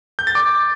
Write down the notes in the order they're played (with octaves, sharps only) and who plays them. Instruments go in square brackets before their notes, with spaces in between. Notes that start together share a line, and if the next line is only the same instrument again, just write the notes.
[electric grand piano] G6
A6
D6